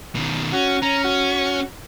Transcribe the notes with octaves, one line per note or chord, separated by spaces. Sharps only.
B2 D#3
C#4 F#4
C#4 A#5
F#4